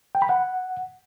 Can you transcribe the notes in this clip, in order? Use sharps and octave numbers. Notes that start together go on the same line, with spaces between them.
G5
B5
F#5